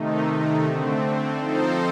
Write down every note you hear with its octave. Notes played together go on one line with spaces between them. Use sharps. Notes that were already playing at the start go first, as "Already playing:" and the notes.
Already playing: C3 D#3 A3 D#4
D3 A3 C4
F3 C4 D#4 A4 C5